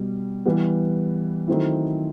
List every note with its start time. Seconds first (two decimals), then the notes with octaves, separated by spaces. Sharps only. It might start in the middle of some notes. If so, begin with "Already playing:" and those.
Already playing: B2 G3
0.45 E3 G3 B3
1.47 D#3 F#3 A3 C4 E4